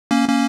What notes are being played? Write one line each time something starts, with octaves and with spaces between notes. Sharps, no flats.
A#3 C#4
A#3 C#4